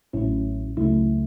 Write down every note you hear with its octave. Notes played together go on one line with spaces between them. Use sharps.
A1 A2 F#3 C#4 E4
C#2 C#3 F#3 A3 E4